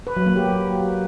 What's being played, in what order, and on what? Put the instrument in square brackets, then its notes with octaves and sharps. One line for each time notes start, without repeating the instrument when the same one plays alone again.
[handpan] B4
F#3
A#3
G4